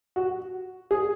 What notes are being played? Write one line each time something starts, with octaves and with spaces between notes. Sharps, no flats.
F#4
G#4